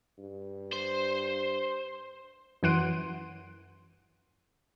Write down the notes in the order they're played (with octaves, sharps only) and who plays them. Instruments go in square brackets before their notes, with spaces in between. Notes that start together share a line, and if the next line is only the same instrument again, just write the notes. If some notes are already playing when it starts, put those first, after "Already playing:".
[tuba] G2
[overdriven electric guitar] C5
[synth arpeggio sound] F#2 E3 F#5 C6 D7 D#7